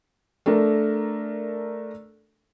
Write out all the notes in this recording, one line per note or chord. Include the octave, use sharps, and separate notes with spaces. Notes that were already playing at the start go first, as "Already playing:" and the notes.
A3 D4 A4 A#4